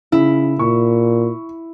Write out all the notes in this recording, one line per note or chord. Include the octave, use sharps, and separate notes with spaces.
C#3 E4
A#2 C#6